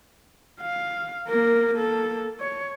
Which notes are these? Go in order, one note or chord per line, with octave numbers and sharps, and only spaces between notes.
F5
A#3 A#4
A#3 A4
C#5